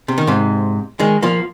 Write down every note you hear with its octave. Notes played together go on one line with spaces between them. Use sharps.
C3
D#3
G#2 C3
D#3 G#3
F3 A#3